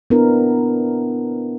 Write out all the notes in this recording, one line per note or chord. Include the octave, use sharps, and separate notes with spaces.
B3 D4 E4 A#4